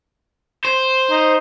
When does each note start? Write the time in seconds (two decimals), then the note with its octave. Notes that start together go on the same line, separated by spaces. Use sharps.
0.65 C5
1.10 D#4